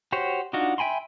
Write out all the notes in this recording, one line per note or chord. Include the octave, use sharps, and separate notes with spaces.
F#4 G4 C5 C#5
D4 D#4 F4 F#4
E5 G5 G#5 B5 C6